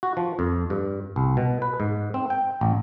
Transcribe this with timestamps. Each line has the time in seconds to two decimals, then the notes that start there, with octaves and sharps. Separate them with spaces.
0.03 F#4
0.17 F3
0.39 F2
0.70 G2
1.16 C2
1.37 B2
1.62 B4
1.80 G#2
2.14 C4
2.30 G5
2.61 A1